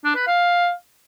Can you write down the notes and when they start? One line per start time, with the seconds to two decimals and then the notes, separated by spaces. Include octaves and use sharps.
0.04 D4
0.16 B4
0.27 F5